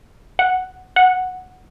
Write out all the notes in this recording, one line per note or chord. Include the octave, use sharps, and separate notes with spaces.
F#5
F#5